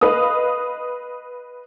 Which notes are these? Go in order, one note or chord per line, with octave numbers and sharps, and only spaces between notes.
B4 D#5 F5 D#6